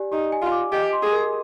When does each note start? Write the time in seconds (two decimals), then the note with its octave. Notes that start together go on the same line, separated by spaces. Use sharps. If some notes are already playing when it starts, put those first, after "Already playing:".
Already playing: G4 D5 G#5
0.12 D#4 G4
0.32 G#5
0.42 F4
0.52 D6
0.72 G4 D#5
0.93 C6
1.03 G#4
1.12 A#4